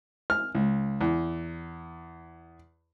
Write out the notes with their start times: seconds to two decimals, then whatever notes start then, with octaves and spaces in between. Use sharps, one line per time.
0.30 F6
0.55 C#2
1.01 E2